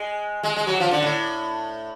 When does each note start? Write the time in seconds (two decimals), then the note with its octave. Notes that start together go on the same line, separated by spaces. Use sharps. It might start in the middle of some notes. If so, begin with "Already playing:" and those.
Already playing: G#3
0.43 G#3
0.56 G#3
0.67 F#3
0.80 F3
0.91 D3
1.03 A2